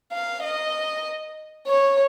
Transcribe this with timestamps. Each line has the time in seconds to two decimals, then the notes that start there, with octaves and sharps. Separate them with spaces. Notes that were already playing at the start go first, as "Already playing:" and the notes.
0.13 F5
0.43 D#5
1.67 C#5